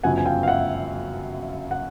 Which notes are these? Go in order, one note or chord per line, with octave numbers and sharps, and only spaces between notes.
G1 F#2 C#3 F3 F#5 G#5
G#5
F5 G5
F5
E5 F#5
F#5